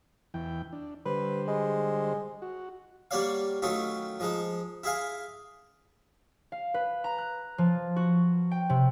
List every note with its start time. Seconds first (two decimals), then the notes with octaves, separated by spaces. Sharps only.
0.34 E2 E3 G5
0.73 D4
1.06 D3 G3 B4 C5
1.48 G#3
2.42 F#4
3.11 G3 A#3 F#4 C#5 D5 F5
3.62 D#3 F#3 A3 C#4 D#4 F4
4.20 F3 G#3 D#4
4.83 E4 G#4 F5 G#5
6.52 F5
6.74 B4
7.04 A#5
7.18 F#6
7.58 F3
7.96 F#4
8.51 G5
8.70 C3